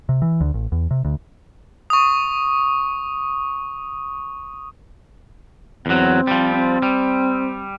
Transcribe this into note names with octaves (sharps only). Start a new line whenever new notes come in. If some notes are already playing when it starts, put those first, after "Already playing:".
C3
E3
D2
A1
E2
C3
D2
C#6 D#6
E2 F#3 C4
F3 G3
C4
G3